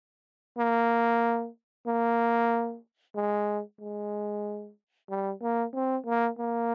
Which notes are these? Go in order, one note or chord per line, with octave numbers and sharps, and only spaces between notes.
A#3
A#3
G#3
G#3
G3
A#3
C4
A#3
A#3